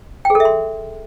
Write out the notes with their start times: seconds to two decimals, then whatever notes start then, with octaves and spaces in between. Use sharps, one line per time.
0.25 G5
0.30 G#4
0.35 A4
0.40 E5
0.45 C6